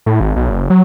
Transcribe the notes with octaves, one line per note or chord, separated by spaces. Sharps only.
A2
G#1
B1
F#1
F#3